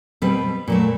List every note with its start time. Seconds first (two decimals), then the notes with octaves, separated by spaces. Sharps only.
0.22 B2 G3 C4 B4
0.68 A#2 F#3 A3